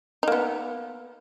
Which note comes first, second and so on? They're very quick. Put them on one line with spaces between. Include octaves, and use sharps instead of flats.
D#4 A#3 B3